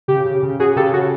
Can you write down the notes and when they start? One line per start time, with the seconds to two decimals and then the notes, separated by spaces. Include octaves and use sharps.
0.08 C#3 G4
0.26 C#3
0.43 C#3
0.60 C#3 F#4 G#4
0.76 C#3 G4 A4
0.93 C#3 F#4